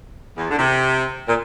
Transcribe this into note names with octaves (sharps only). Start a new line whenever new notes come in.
E2
D3
C3
A#2